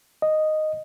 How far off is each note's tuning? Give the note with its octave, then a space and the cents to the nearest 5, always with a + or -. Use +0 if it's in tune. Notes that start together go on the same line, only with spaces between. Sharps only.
D#5 -5